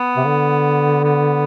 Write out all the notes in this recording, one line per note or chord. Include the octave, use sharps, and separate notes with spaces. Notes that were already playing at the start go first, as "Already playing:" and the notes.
Already playing: B3
C3
D3
B3